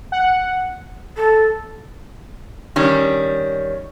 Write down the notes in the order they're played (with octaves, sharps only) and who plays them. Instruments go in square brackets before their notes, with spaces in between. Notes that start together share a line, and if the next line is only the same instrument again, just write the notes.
[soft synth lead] F#5
[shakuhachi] A4
[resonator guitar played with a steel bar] D#3 G3 C#4